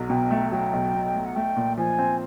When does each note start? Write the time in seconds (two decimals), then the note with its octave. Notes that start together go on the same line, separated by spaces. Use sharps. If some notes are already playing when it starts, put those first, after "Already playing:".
Already playing: B1 F#3
0.10 B2 G5
0.31 A3
0.51 F#3 G5
0.73 B1
0.94 B2
1.14 A3
1.25 F#5
1.35 A3 G5
1.56 A#2
1.77 F3 G#5
1.99 C4